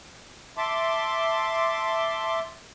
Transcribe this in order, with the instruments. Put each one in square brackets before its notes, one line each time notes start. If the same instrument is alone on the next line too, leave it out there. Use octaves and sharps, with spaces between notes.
[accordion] E5 A5 C6 D6